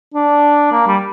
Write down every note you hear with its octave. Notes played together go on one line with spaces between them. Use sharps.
D4
A#3
G3